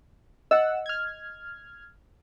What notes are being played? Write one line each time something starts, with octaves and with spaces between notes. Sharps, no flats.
D#5 F#5 E6
F6 G#6